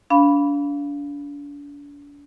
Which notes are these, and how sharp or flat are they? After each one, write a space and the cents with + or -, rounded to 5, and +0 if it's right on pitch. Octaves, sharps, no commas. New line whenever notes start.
D4 -35 F5 -5 B5 +0